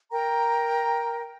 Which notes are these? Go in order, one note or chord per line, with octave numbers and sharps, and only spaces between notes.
A#4 G5 A#5